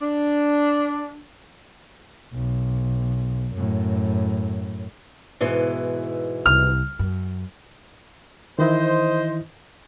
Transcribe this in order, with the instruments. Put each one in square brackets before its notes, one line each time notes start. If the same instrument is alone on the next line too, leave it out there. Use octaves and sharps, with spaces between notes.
[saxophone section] D4
[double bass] B1
F#2 A2
[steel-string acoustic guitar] G#2 B2 E3
[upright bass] C2 [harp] F6
[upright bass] F#2
[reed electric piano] D#3 E3 E4 [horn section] C5 D#5